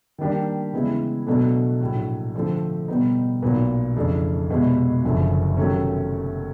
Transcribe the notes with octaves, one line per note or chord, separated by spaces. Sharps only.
D#3 G3 A#3 D4 G4
C#3 E3 G#3 B3 E4
B2 F#3 A3 D4
A#1 A2 F#3
D3 F3 A3 C4
B2 G3 B3 D#4
B1 A#2 F#3 B3
F2 C#3 E3 A3 D4
C2 B2 G#3 B3
F#1 F#2 D3 F3
C3 D#3 F#3 A3 C#4